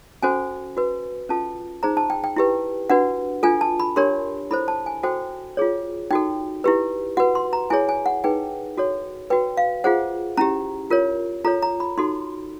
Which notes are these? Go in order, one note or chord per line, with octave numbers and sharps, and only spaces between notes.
C#4 F#4 A4 C5 G#5
F#4 B4
C#4 F4 A4 A5
D#4 G#4 C5 A#5
A5
G5
G5
E4 G4 B4
D4 F#4 B4 F#5
D4 F4 A4 G#5
A5
B5
D4 G4 A#4 C#5 C6
E4 A4 C5 B5
A5
G#5
F#4 A4 C5 G5
F4 G#4 C#5
D#4 F#4 A4 G5
E4 G4 B4
F#4 B4 F#5
C6
A#5
E4 G#4 C#5 G#5
G#5
F#5
D#4 G#4 B4 G5
F#4 A4 C#5
F#4 B4 G5
F5
F4 G#4 C5 F#5
C#4 E4 G4 A#5
F4 A#4 C#5
F4 A4 C#5 A#5
A#5
B5
D#4 F#4 A4 C6